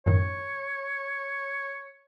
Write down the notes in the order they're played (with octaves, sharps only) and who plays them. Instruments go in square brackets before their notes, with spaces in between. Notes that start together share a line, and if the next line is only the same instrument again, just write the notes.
[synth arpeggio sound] F#2 A2 D#3 [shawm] C#5